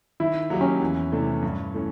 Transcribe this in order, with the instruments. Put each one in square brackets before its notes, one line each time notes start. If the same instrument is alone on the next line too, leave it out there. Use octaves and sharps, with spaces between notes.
[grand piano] D#3 [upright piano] E4
[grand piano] F#3 A#3 D#4 G4
[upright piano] C#4
[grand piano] E2
C3 E3 A3 D4
G2
E3 A3 C#4